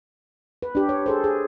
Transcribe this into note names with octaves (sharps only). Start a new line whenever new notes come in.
B4
D4 G4
C#5
G#4 A4 C5
G#4